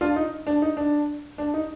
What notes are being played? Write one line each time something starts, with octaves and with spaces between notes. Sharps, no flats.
D4 F4
D#4
D4
D#4
D4
D4
D#4